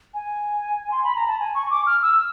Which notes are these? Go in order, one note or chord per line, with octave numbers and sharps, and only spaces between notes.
G#5
C6
B5
A#5
A5
G#5
C#6
D6
F6
E6